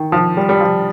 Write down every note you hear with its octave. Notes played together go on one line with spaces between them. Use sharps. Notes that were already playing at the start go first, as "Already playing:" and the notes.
Already playing: D#3
F3
G3
G3
F3